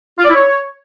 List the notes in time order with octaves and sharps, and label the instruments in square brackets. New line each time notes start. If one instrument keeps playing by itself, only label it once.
[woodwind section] F4
D5
E4
C#5